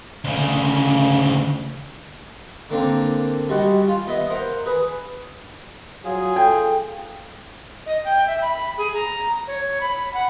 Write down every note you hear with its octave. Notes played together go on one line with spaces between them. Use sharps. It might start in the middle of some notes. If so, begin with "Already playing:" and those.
D2 C#3
D3 A#3 C4 D4
G3 G#3 F#4 F#5
F4
B3 D#5 E5
A#4 C5 F#5
G#4 B4
F#3 F4 G#4
A4 G5
D#5
G5
E5
B5
G#4
A#5
C#5
B5
F#5